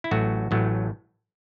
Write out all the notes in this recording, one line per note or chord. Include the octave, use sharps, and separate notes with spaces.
E4
A1 A2 F#3 A3 F#4
A1 A2 F#3 A3